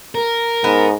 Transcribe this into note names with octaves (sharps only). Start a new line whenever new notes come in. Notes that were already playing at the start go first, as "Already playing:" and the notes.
A#4
G#2 B3